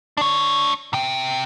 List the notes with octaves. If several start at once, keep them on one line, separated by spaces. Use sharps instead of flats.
D4 C#5
C3 G5